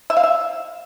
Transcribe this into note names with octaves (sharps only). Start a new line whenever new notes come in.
E5
F5
E5